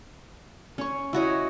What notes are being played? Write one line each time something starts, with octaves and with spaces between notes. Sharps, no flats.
C#4 C#5 C#6
E4 F#4 C#5 D#5